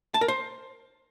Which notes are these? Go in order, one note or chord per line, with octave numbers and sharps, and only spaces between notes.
A5
A#4
C5